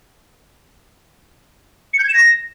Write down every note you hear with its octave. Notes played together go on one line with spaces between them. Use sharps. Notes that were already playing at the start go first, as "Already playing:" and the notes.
C#7
G6
G#6
E7
A#6